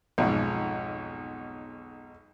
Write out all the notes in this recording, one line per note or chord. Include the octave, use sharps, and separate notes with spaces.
B1 F2 G#2